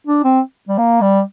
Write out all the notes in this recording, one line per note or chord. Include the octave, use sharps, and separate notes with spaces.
D4
C4
G3
A#3
G3